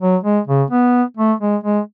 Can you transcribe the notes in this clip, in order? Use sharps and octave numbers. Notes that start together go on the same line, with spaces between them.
F#3
G#3
C#3
B3
A3
G#3
G#3